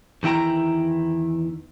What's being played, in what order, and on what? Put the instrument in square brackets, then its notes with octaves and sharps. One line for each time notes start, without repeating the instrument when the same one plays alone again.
[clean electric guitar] E2 D#3 E4 G5 A#5